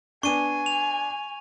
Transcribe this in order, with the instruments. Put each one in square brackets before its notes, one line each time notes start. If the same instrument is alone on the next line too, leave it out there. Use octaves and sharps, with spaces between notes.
[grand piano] B3 D4 [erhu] G#5 [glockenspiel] C#6 D#7
[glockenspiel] F7